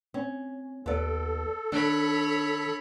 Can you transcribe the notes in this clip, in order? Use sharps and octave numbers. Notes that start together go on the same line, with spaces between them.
C4 C#4
D#2 B3 A4 D5
D#3 D4 C#5 B5